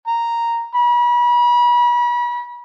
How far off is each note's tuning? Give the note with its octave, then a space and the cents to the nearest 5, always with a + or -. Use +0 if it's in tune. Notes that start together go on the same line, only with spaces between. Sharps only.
A#5 -5
B5 -35